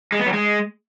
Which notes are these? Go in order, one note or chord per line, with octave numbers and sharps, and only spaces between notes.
G#3
B3
F#3
G#3